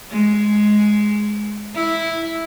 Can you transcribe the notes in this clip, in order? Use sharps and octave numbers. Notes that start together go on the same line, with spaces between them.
G#3
E4